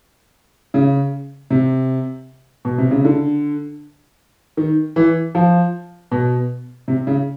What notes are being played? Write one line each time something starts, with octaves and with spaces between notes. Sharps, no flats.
C#3
C3
B2
C3
C#3
D3
D#3
E3
F3
B2
C3
C#3